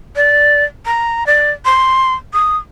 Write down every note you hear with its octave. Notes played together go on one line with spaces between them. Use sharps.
D5
A#5
D5
C6
D#6